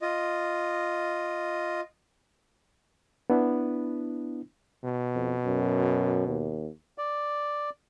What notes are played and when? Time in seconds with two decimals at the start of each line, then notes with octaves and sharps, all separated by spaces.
0.02 F4 D#5
3.30 B3 D4 E4
4.84 B2
5.15 F2
5.45 F#2
6.27 D#2
6.98 D5